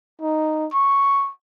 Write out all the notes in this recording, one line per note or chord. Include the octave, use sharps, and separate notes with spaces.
D#4
C#6